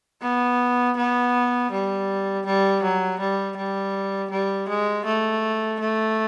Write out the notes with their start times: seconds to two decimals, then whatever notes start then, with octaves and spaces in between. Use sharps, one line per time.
0.22 B3
0.97 B3
1.71 G3
2.46 G3
2.83 F#3
3.20 G3
3.56 G3
4.31 G3
4.68 G#3
5.05 A3
5.80 A3